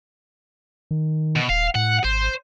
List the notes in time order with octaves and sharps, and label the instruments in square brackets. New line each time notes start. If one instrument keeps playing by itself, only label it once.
[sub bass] D#3
[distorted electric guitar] B2
[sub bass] D#1 [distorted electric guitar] F5
[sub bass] A2 [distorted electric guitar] F#5
[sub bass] G#1 [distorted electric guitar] C5